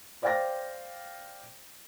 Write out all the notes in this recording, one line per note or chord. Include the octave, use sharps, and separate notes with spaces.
C5 D5 F5 G5 A6 A#6